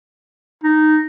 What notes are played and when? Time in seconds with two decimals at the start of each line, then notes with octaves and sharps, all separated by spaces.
0.64 D#4